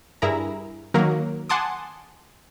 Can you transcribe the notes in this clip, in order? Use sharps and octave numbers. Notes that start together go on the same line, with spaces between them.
G2 E4 G#4 A#4 A#5
D#3 F#3 A#3 A#4
F#5 G#5 A5 C6 D6 D#6